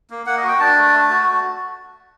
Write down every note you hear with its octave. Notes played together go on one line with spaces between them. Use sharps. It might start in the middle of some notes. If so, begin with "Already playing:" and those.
A#3
A#3 F#5
D#5
F#4
G5
D4 A5
A3
A3
F#4